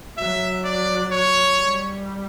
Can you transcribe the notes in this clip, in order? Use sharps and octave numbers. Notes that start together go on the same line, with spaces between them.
F#3 E5
D5
C#5
G3